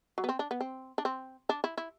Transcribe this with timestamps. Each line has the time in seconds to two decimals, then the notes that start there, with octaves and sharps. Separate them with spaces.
0.18 F#3
0.24 B3
0.29 C4
0.39 D4
0.51 B3
0.61 C4
0.98 D4
1.05 C4
1.49 D4
1.64 E4
1.78 E4